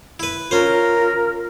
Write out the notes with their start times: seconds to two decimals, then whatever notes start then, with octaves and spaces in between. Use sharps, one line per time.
0.20 E4 B4
0.51 C#4 F4 A#4 C5